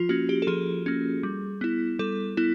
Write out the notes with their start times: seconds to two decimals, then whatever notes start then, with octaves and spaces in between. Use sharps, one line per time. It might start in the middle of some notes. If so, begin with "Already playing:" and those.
Already playing: F3 F4
0.09 A#3 C#4 F#4
0.29 G4
0.42 A4
0.47 F3 G#4
0.86 A#3 C#4
1.23 G3
1.61 B3 E4
1.99 G3 A4
2.37 B3 E4